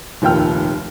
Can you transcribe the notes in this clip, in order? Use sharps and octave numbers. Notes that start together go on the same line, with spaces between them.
F1 D#2 A#2 G5 F6